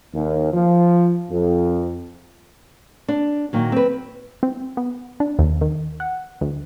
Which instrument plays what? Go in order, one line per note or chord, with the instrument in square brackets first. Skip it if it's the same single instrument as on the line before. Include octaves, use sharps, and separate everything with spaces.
[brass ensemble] D#2
F3
F2
[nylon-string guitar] D4
A#2 D#3 F#3
C4 B4
[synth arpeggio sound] C4
B3
D4
D#2
D#3
F#5
D2